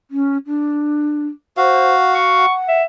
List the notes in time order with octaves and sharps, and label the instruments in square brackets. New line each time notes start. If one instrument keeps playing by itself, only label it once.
[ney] C#4
D4
[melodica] F#4 F5 [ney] C5
[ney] F#5 [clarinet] C#6
[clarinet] E5